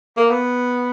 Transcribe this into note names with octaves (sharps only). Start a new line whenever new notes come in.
A#3
B3